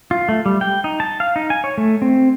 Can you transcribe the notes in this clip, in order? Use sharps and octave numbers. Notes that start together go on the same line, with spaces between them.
F4
A3
G3
G5
D#4
A5
F5
D#4
G#5
C#5
A3
C4